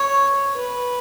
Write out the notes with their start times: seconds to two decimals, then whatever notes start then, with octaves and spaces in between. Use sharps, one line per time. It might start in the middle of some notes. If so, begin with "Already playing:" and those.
Already playing: C#5
0.56 B4